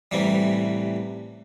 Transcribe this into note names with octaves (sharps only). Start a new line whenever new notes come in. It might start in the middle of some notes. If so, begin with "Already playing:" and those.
A1 C3 E3 G3